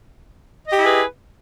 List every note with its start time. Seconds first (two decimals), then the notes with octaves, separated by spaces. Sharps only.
0.68 D#5
0.72 G4
0.76 E4
0.79 G#4
0.83 B4